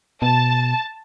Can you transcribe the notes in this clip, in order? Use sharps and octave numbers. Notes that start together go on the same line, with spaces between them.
B2 A5